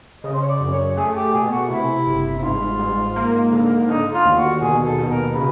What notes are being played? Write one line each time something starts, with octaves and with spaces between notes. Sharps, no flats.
C#3 D#5
C5
C#5
D5
F#2
C#5
A3 G#4
G4
B2 G#4
F#4
C3 E4
G1
E4
G#2 F4
G#2
A#3
D3
D3 D#4
F4
D#2
F#4
B2 G#4
A4
B2
A#4
C#3 B4